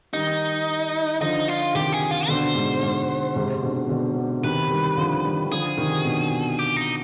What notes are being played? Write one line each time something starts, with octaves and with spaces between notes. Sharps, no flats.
D#3 G3 D#4
D3 F3 D#4
F4
C3 D#3 G4
G#4
F4
B2 D3 C5
G#2
G#2
G#2 C3
B2 D3
B2 D3
C3 D#3 B4
D#3 G3
D3 F3
D#3 G3
D#3
D3 F3 G#4
C3 D#3
B2 D3
G4
D#4